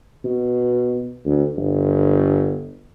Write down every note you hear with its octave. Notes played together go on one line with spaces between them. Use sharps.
B2
D2
G1